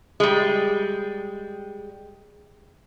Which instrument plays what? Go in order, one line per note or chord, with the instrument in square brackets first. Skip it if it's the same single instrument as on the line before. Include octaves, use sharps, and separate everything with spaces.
[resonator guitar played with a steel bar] G3 G#3